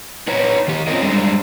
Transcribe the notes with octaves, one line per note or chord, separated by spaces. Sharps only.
D#4 B4 C#5 A#5
D#3 G4
C4 C#4 F4 A#4 D#5
G3 G#3 D4 A#5